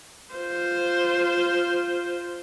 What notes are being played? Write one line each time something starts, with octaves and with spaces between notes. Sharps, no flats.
F4 C5